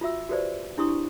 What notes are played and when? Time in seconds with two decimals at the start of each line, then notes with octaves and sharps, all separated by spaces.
0.01 F4 F#4 E5 E6
0.29 F#4 G4 B4 C5 D5
0.77 D4 E4 G4 C6 C#6 D#6